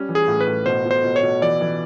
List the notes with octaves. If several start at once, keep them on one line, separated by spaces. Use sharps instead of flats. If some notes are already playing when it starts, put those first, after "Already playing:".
Already playing: G3 C#4
E3
G#4
A2
B4
A2
B2 C5
B2
C5
B2
C#5
B2
E3 D5
E3